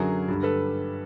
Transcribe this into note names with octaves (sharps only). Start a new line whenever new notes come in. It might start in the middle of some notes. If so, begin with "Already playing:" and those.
Already playing: F#2 D3 F#3 G#4 A#4
G2 D3 G3
A4 B4